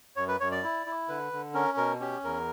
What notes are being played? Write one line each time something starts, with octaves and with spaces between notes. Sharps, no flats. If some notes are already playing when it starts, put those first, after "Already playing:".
F#2 C#5
B4
F#2 C#5
D5
E4
E4
D3 B4
D3
C#4 A#4
B2 A#4
C#4 G4
E2 A#4